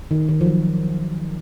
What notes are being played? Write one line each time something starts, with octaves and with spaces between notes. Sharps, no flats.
D#3
D#3
F3
F#3